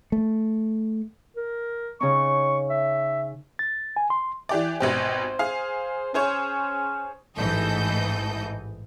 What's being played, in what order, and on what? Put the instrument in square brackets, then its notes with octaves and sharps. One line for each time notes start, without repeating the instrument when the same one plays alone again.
[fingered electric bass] A3
[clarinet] A#4
[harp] C#3 C#4 D#4 [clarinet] C#6
[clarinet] E5
[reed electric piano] A6
G#5
C6
[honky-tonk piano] E3 G4 D5
[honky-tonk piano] G#1 B2 G4 [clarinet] C5
[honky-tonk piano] G#4 F5
[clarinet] C#4 [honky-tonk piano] G#4 C5 C#5
[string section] A1 G#2 E3 A4 D#5 G6